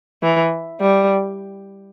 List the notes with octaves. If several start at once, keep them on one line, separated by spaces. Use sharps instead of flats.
E3
G3